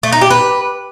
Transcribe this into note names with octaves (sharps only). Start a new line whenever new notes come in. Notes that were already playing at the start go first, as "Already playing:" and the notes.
A3
D#4
G4
B4